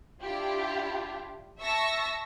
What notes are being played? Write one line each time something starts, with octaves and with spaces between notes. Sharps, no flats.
D4 E4 F4 G4
E5 A5 C#6 E6 A#6